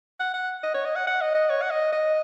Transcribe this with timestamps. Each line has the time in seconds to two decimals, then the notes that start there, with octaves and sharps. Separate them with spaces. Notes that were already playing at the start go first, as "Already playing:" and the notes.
0.20 F#5
0.34 F#5
0.63 D#5
0.74 C#5
0.85 D#5
0.96 F#5
1.07 F#5
1.21 D#5
1.35 D#5
1.50 C#5
1.62 F#5
1.71 D#5
1.92 D#5